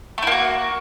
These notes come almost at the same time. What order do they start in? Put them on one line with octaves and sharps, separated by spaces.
A3 E4 A#3 F#4